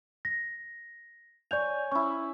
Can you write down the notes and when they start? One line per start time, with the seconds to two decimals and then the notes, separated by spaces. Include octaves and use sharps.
0.25 A#6
1.51 C#5 D5 G#5 G6 F7
1.91 C#4 E4 C#6